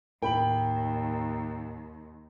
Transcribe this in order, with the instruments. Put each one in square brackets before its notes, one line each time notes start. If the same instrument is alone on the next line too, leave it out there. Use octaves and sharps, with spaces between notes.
[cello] D#2 [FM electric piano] A2 [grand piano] A#4 B5 F#7 [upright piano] G5